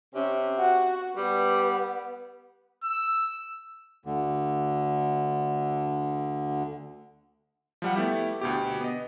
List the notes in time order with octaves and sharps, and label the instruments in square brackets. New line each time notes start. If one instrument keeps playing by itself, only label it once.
[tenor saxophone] C3 [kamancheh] C#4
[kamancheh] F#4 F#5
[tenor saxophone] G3 [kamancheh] B3
[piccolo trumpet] E6
[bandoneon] D2 D3
[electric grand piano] F3 G3 F#5
A3 B3 E4 G4
D2 B2 G4
B3 D#5